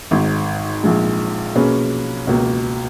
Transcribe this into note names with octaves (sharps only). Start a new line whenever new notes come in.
G#1 G#2 D#3
A#1 A#2 G#3
B2 A#3 C#4 G#4 B4
C#2 B2 A#3